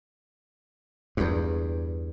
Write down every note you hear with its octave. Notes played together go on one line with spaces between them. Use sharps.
E2 G2